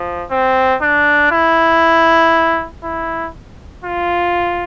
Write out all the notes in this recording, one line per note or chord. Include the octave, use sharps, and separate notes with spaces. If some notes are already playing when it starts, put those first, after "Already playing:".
Already playing: F3
C4
D4
E4
E4
F4